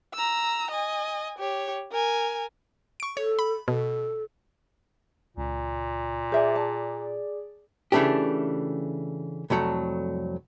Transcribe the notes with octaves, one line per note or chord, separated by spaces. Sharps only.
A#5 E6
D#5 G#5
G4 C#5
A#4 G#5
C#6 D7
A4 C#5
B5
B2 A4
C#2 A#2
G#4 C5 D5 E5 G#5
A5
C#3 E3 A3 D4 G4
C2 F2 F#3 A3